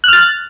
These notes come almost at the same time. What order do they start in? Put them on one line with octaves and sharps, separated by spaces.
F#6 F6 A6